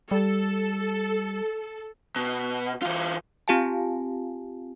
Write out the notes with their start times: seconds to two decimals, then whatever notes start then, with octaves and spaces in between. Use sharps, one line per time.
0.11 G3 A4
2.16 B2
2.82 E3 F4
3.48 C4 F4 G4 F5 G#5 A5